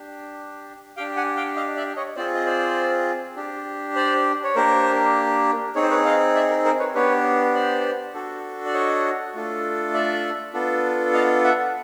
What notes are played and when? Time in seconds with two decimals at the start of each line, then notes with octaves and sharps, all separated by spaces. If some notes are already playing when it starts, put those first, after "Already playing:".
Already playing: D4 G4
0.97 D4 G4 F5 G5
1.16 F#5 G#5
1.36 F5 G5
1.56 D#5 F5
1.76 D5 E5
1.96 C#5 D#5
2.16 C4 F4 G#4 C5 D5
2.34 D#5
2.46 C5 D5
3.36 D4 G4
3.96 C5 D5
4.44 C#5
4.55 A#3 D4 G4 A#4 C5
5.75 C4 D#4 G#4 C#5
5.83 C5
5.90 B4 C#5
6.05 D#5 F5
6.35 D5 E5
6.50 A#4
6.65 A#4 C5
6.79 B4 C#5
6.95 B3 D4 G4 B4 C#5
7.55 C5 D5
8.14 D4 F#4 A4
8.66 D5
8.74 C#5 D#5
9.34 A3 D4 F4 A4
9.94 D5 E5
10.53 B3 D4 F4 A4
11.14 D#5 F5
11.44 E5 F#5